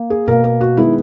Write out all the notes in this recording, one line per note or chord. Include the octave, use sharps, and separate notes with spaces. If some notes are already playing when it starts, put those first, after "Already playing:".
Already playing: A#3
G#4
B2 A#3 A#4
A#4
F#4
D#3 G#3 B3 E4